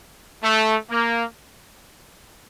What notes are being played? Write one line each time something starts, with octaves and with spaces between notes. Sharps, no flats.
A3
A#3